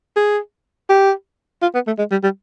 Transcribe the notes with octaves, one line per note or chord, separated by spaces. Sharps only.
G#4
G4
F4
B3
A3
G#3
G3
G3